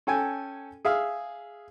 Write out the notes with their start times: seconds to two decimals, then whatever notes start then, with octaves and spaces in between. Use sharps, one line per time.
0.07 C#4 A4 G5 G#5
0.85 G#4 E5 F5